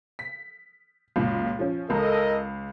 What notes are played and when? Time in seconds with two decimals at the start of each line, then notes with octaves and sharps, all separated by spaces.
0.19 B6
1.16 C#2 F#2 A#2
1.59 F3 C#4
1.90 C#2 A4 A#4 D#5